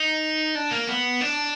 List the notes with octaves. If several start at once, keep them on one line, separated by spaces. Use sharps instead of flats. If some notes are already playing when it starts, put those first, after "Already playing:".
Already playing: D#4
D4
A#3
B3
D4